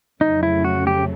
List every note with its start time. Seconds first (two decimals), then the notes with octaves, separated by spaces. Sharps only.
0.21 F2 C#3 F#3 A3 D#4
0.43 E4
0.64 F#4
0.87 G4